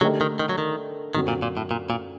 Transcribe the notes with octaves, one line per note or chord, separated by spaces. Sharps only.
D3 F#3 A3 D#4 G4 A#4
D#3
D#3
F#3
D#3
F#2 D3 D#3 F#3 C4
A#2
A#2
A2
A#2
A#2